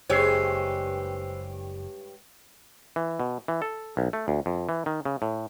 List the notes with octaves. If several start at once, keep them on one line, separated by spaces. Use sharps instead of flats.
F#1 G2 G#3 G4 C5 C#5 E6 C7
E3
B2
E3
A4
B1
A3
D2
F2
E3
D#3
C#3
A2